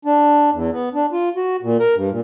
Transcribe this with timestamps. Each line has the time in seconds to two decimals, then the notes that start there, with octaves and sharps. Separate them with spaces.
0.05 D4
0.53 E2
0.72 B3
0.94 D4
1.12 F4
1.36 F#4
1.63 A#2
1.80 A#4
1.95 G2
2.10 A#2